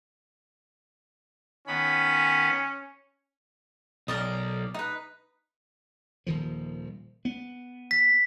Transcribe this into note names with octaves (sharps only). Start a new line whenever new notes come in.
D#3 B3 C#4 B5
B1 A#4 D5 D#5
D#4 B4
D#1 D#3 F3
B3
B6